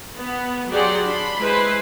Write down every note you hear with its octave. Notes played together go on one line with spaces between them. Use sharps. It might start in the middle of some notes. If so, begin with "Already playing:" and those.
B3
F#3 G4 G#4 D5 F#5 C6
D4 B5 C6
G#3 E4 B4 C5